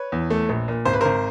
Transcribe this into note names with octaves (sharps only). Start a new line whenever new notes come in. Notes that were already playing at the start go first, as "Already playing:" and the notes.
Already playing: B4 C#5
E2
A3
A#1
A#2
G#1 C5
B4
G#1 A#4 C5